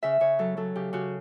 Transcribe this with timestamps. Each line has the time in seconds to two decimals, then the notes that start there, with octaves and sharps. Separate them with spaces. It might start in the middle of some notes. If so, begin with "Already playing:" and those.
0.03 C#3 E5
0.20 C#3 C#5
0.39 F#3 A4
0.57 F#3 A4
0.76 C#3 G4
0.93 C#3 F#4